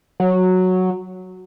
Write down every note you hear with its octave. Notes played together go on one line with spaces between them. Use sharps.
F#3